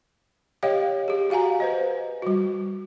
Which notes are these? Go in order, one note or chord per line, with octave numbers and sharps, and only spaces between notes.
G4 C#5 D#5 F5 G5
G4 G#4
F#4 F5 F#5 G#5 A#5
B4 C5 D#5
G3 F#4